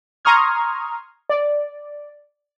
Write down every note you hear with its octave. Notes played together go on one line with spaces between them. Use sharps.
A#5 C6 C#6 D#6 F6 G#6
D5